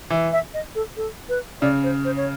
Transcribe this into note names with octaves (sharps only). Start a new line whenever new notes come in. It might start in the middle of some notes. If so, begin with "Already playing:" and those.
E3
E5
D#5
A4
A4
B4
C#3 D5
C5
C5
C#5